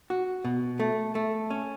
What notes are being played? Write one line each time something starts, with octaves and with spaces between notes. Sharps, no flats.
F#4
B2
A3
A3
C#4